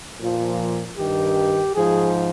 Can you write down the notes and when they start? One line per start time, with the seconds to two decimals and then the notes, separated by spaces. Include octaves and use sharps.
0.19 A#2 F3
0.98 G2 D#3 G4
1.76 G#2 F3 G#4